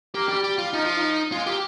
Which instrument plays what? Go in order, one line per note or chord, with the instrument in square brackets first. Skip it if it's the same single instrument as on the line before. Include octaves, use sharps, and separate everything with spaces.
[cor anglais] A#3 [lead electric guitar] G4
[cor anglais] G3 [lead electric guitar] G4
[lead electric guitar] G4
F4
[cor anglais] F3 [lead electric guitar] D#4
[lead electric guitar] F4
D#4
[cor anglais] G#3 [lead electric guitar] F4
[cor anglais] A#3 [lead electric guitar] G4